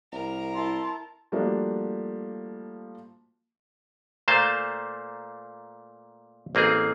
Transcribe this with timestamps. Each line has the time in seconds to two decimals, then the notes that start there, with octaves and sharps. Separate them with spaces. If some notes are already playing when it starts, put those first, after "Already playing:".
0.12 C2 A#4
0.55 E4 A5 C6
1.32 F3 G3 A3 A#3 D4 F#4
4.28 A#2 A3 A#3 C5 A5
6.55 A1 A#3 C4 G#4